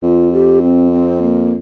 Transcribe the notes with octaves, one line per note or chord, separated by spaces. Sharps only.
F2 F4
G4
C4
C4
A#3